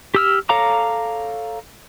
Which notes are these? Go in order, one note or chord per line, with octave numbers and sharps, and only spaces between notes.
G4 E6 F6
A4 C#5 F5 A#5 D6